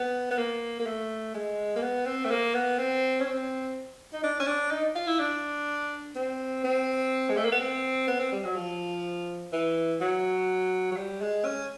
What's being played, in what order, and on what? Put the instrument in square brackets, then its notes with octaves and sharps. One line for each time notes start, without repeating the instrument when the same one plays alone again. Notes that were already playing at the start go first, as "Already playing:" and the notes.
Already playing: [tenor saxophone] B3
B3
A#3
A#3
A3
G#3
A#3
B3
C4
A3
A#3
B3
C4
C#4
C4
D#4
D4
C#4
D4
D#4
F4
E4
D4
C4
C4
G#3
A3
A#3
B3
C4
B3
C4
G3
F#3
F3
E3
F#3
F#3
G3
G#3
C#4